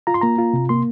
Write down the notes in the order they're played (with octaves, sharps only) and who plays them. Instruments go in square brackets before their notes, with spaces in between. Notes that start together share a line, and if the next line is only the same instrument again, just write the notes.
[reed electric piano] F4 A#5
C6
A#3 A#5
F4
C3
A#3 C6